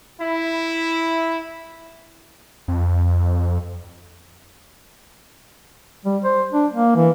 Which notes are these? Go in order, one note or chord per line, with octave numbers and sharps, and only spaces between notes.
E4
F2
G3
C5
D4
A#3
E3